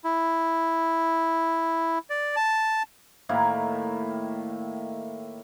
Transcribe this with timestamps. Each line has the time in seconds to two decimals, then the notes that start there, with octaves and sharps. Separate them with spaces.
0.04 E4
2.10 D5
2.36 A5
3.29 A2 D#3 A#3 E4